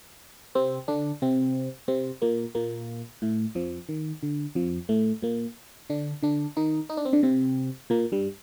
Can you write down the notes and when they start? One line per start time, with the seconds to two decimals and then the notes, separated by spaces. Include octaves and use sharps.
0.55 C3 C4
0.88 D3 D4
1.22 C3 C4
1.88 C3 C4
2.22 A#2 A#3
2.55 A#2 A#3
3.22 A2 A3
3.55 F2 F3
3.89 D#3
4.23 D3
4.55 F2 F3
4.89 A2 A3
5.22 A#2 A#3
5.90 D3 D4
6.23 D3 D4
6.57 D#3 D#4
6.90 D#4
6.97 D4
7.05 C4
7.13 D3 D4
7.23 C3 C4
7.90 A#2 A#3
8.12 G2 G3